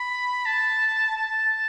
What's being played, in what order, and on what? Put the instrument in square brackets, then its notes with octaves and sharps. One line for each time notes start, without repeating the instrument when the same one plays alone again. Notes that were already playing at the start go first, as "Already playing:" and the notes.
Already playing: [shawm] B5
A5
A5